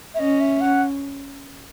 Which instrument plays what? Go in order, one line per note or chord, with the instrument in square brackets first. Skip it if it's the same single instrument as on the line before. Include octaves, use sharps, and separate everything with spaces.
[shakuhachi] E5
[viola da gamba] C#4 [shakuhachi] D#5
[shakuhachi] E5
F#5